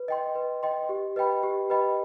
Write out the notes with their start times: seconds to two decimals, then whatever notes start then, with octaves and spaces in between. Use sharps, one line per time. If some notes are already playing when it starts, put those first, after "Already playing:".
Already playing: B4
0.08 D#5 G5 C6
0.35 B4
0.63 D#5 G5 C6
0.89 G4
1.16 B4 D#5 G5 B5
1.43 G4
1.70 B4 D#5 G5 B5